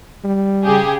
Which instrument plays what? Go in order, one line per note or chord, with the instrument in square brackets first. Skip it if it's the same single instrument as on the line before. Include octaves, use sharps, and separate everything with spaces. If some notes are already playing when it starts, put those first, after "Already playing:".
[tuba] G3
[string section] C#3 G4 G#4